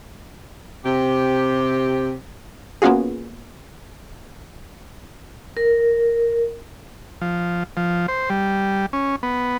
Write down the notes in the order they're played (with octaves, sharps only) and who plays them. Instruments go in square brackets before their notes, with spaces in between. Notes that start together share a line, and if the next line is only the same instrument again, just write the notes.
[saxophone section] C3 G4
[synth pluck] A#3 B3 C#4 F4 F#4 G#4
[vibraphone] A#4
[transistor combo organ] F3
F3
C5
G3
C#4
B3